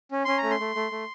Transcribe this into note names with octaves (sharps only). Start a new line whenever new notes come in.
C#4
C#4 C6
A#5
A3
C6
A3
A3
A3